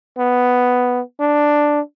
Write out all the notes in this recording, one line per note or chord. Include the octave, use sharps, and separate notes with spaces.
B3
D4